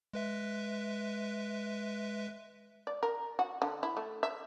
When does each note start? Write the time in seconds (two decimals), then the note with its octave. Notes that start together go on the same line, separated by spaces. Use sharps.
0.13 G#3 B4 E5
2.87 D5
3.03 A#4
3.39 F#4
3.62 D3
3.83 E4
3.97 A3
4.23 E5